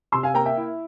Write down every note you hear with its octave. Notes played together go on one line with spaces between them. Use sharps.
C3 C6 E6
F5 G#5
A#3 G5 A#5
E5 G5
E4